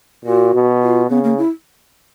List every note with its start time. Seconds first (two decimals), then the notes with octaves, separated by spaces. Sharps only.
0.25 A#2 F#4
0.54 B2
0.83 F4
1.10 C#3 B3
1.24 A#3
1.38 E4